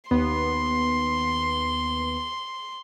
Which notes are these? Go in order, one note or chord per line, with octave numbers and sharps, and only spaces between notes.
D#2 B3 C6